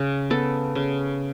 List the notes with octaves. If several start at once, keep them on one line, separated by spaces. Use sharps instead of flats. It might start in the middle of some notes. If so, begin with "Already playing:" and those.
Already playing: C#3
B3 A4
C#3